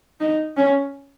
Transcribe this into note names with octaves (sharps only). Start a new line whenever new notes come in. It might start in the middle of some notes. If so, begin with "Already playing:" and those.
D#4
C#4